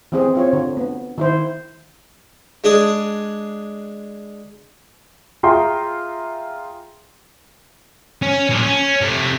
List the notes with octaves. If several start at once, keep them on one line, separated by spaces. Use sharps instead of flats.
E3 C4 G#4
C4 F4 C#5
D3
B3
D#3 E4 C5
G#3 D4 G#4
F4 G#4 E5 G5 A#5 C6
C#4
A#2 D4
C#4
C3 A3